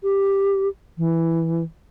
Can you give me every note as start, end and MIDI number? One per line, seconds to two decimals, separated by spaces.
0.03 0.68 67
0.98 1.64 52